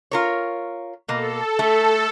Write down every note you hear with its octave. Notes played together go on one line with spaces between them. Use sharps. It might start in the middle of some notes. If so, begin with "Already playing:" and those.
F4 A#4 C#5
B2 A#3 A4
A3